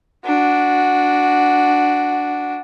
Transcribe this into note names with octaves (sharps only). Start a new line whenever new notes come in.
D4 F#4